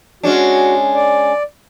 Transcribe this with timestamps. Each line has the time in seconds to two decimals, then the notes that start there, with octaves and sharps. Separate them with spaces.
0.23 G#3 C#4 D4 F#4
0.95 D5